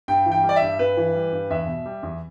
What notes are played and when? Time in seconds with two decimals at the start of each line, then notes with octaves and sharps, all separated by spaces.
0.08 G2 G5
0.26 E3
0.32 G5
0.43 G3
0.49 D5
0.56 E5
0.62 G2
0.79 G2 B4
0.97 E3
1.15 G3
1.32 G2
1.50 E2 E5
1.67 B2
1.86 G3
2.03 E2